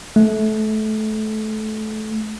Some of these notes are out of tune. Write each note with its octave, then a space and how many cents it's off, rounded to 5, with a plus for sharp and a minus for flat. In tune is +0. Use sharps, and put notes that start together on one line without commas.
A3 -25